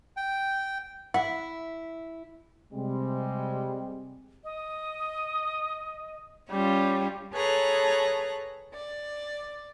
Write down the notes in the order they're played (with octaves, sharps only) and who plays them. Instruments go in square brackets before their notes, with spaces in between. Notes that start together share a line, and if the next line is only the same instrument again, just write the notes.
[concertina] G5
[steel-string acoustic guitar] E4 E5 [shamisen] F#5
[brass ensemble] C3 G3 G#3 C4
[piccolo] D#5
[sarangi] G3 [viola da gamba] C#4 F4
[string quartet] G#4 A4 B4 C#5 A#5 F#6
D5